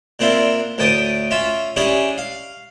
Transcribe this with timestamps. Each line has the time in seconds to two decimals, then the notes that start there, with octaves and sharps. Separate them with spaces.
0.19 A#2 C4 D4 E4 F4
0.78 D2 A2 G5 A5 D6 D#6
1.31 C#4 F4 E5
1.76 C#4 D4 E4 G4 G#4
2.18 F5